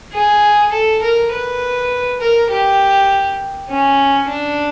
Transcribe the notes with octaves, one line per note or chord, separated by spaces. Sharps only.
G#4
A4
A#4
B4
A#4
G4
C#4
D4